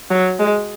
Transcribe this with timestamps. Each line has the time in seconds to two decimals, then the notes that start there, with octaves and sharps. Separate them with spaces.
0.11 F#3
0.40 G#3